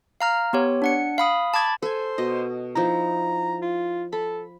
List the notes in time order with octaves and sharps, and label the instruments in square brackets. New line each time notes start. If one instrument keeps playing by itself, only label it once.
[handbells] F5 A#5 F6
B3 G4 C#5
D4 F#5 C#7
F5 B5 D#6
A5 B5 D6 G#6 A6
[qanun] A4 G#5 [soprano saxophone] C5
[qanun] B2 D#5
[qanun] F3 D#4 E4 [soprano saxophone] A#5
[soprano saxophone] F4
[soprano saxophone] A4 [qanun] B5